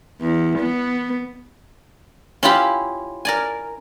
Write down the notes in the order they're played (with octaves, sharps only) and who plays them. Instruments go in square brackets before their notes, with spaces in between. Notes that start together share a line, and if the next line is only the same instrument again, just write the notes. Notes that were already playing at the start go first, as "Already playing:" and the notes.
[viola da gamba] E2
B3
[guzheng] C#4 E4 F4 G4 B5
A#4 D5 G#5